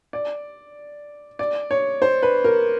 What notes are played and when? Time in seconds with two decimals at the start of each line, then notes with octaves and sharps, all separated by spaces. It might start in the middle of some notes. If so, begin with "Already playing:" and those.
0.13 D5
1.39 D5
1.71 C#5
2.02 C5
2.22 B4
2.44 A#4